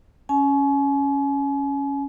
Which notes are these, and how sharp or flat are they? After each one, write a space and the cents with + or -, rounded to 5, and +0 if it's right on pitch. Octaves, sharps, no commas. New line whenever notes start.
C#4 +0 G#5 +35